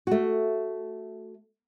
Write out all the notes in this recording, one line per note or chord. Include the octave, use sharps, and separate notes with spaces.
A3 F#4